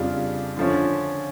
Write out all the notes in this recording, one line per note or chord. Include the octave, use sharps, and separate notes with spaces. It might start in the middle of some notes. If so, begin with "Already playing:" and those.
Already playing: F2 C#3 G3 D4 F4
D3 F3 C#4